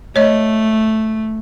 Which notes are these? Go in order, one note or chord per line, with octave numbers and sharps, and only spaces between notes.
A3 C#5 D#5